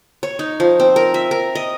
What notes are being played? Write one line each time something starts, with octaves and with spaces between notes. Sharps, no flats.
C#5
D#4
F3
C4
A#4
E5
A#4
D#5